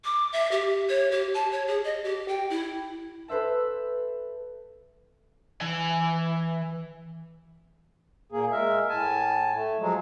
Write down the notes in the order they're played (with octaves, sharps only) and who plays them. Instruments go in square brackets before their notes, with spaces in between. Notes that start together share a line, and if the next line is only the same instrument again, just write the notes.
[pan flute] D6
E5
G4
C#5
G4
A5
C#5
G#4
D#5
G4
G5
E4
[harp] A4 B4 C5 E5 A5
[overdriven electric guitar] E3 G#5
[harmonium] A#2 A#3 G#4
G#3 A#4 E5
A2 G#5 A5
A3
F3 F#3 G#3